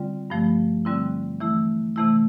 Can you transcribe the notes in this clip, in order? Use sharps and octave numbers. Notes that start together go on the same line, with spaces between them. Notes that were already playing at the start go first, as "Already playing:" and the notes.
Already playing: D3 G3 C4 F4
G2 F3 A3
D3 G3 C4 E4
E3 A3 E4
C3 E3 A3 E4